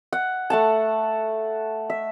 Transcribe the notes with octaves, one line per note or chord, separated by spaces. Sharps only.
F#5
A3 F#5 A5
E5